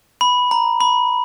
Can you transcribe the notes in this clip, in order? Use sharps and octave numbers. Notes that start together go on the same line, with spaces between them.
B5
A#5
B5